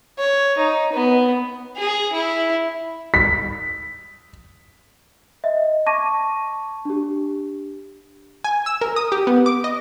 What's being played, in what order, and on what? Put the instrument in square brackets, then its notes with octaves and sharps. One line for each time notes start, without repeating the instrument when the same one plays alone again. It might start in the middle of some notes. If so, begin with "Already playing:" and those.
[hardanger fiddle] C#5
D#4
B3
G#4
E4
[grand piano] B6
[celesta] D#5 E5
A5 C#6 D6 G#6 A#6 D#7
D4 G4
[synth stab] G#5
E6
A#4
D#6
G4
B3
D6
D#5